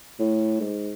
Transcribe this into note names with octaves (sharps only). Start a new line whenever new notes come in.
A2
G#2